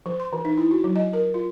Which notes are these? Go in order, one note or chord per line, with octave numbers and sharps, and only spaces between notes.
F3
C6
E3
D#4
E4
F#4
F#3
D#5
A#4
F4